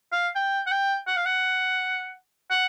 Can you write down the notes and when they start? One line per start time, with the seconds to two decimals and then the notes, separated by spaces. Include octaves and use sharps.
0.12 F5
0.35 G5
0.67 F#5
0.71 G5
1.07 F#5
1.17 F5
1.25 F#5
2.51 F#5